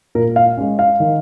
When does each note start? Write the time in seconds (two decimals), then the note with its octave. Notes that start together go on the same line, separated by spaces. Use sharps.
0.15 A#2 A#4
0.36 F5
0.57 G#3 C#4
0.79 F5
1.00 D#3